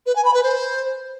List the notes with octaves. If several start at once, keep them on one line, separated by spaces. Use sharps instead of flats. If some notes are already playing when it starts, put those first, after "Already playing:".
B4
G#5
B5
B4
C5